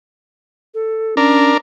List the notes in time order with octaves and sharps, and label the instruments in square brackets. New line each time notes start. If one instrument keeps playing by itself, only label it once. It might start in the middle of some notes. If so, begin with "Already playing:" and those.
[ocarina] A4
[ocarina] C#4 [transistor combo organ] D4 A#4